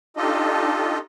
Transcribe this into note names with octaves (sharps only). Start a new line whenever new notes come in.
D4 D#4 F4 G4 A4 D#5